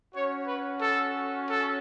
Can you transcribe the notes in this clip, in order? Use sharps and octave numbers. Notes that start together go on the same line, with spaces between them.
C#4 F#4 C#5
B4
A4
A4